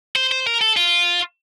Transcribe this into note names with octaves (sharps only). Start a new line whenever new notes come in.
C5
C5
A#4
A4
F4